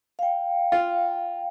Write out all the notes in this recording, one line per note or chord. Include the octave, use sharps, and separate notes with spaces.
F5 G5
F4